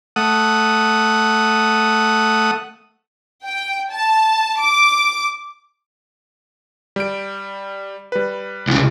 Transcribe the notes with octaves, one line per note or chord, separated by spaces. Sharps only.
A3 F#5 D#6
G5
A5
D6
G3 D7
G3 B4
C2 C#3